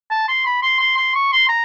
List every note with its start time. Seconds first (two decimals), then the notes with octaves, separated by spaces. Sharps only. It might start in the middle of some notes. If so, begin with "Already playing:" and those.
0.10 A5
0.28 C6
0.46 B5
0.62 C6
0.80 C6
0.97 C6
1.15 C#6
1.32 C6
1.49 A#5